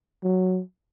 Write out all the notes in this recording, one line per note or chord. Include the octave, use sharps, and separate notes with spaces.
F#3